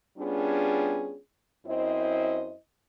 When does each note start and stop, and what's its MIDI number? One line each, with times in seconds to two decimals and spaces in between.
0.18 1.17 55
0.18 1.17 59
0.18 1.17 61
0.18 1.17 62
0.18 1.17 65
0.18 1.17 68
1.66 2.54 42
1.66 2.54 60
1.66 2.54 64
1.66 2.54 72
1.66 2.54 75